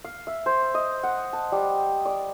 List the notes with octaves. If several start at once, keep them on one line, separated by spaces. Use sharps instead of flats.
F5
E5
C5
D#5
F#5
A5
G3
D5